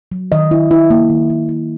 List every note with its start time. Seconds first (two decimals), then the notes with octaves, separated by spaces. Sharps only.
0.12 F#3
0.32 D#3 D#5
0.51 E4
0.71 E4
0.90 A#3
1.09 D#3
1.30 A#3
1.49 E4